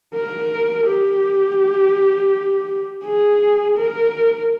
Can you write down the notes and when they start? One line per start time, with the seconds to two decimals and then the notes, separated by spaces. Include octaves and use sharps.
0.15 A#4
0.87 G4
3.04 G#4
3.77 A#4